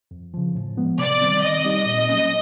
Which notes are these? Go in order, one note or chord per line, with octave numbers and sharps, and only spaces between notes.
F2
C#3 F3
A2
F3 G#3 B3
C3 D5
D#3 G3 C4
D#3 D#5
G3 C4 D#4 G4
A#2
F#3 A#3 C#4